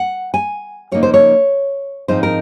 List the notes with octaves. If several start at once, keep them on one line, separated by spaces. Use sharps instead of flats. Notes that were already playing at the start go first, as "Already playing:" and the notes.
Already playing: F#5
G#5
C#3 F3 A#3 D#4 C#5
C5
C#5
G#2 F3 C4 D#4 C5
A#4